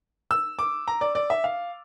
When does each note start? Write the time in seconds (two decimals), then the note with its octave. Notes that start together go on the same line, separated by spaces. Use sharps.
0.31 E6
0.59 D6
0.88 A#5
1.01 D5
1.15 D5
1.30 E5
1.44 F5